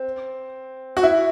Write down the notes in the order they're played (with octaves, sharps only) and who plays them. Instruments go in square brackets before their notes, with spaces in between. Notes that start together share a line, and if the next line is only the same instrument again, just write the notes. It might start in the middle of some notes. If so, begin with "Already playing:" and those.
Already playing: [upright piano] C4
F#4
E4